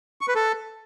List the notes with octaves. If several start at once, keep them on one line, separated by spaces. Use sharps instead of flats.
C#6
B4
A4